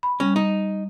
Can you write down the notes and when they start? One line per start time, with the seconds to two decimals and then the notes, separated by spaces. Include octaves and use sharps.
0.03 B5
0.20 G3 C#4
0.36 D#4